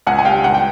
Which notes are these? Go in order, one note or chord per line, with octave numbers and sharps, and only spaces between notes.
C#2 F#5 G#5
G#5
G3 F5 G5
C#2 F#5
G5